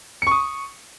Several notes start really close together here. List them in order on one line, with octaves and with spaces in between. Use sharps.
C#7 C#6 D#6